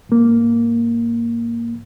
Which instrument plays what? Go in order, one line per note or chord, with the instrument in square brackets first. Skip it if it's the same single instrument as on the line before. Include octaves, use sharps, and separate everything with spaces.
[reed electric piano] G#2 A#3